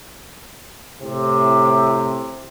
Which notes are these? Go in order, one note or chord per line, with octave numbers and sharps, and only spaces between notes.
A2 C3